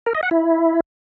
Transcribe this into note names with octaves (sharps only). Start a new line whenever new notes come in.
A#4
D#5
F#5
E4